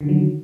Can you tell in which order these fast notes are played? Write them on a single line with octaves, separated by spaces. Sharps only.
D3 D#3 F#3